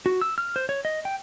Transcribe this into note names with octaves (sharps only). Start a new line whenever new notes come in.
F#4
E6
F6
C5
C#5
D#5
G5